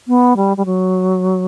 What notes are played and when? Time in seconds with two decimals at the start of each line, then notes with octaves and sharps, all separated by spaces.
0.08 B3
0.37 G3
0.57 G3
0.66 F#3